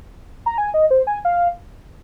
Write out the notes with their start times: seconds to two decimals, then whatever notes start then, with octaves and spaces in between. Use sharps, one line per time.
0.46 A#5
0.58 G#5
0.74 D#5
0.91 C5
1.07 G#5
1.25 F5